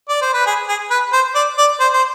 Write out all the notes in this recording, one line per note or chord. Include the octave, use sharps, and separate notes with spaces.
D5
C5
B4
G#4
G#4
B4
C5
D5
D5
C5
C5